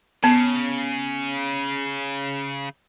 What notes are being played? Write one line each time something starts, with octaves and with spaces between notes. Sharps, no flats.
C#3 B3